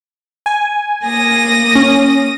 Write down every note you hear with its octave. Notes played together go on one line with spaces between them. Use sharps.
G#5
A#3 D#6 A#6
C#4